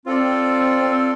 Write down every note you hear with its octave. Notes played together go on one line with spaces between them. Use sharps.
C4 F4 A4 D5
C4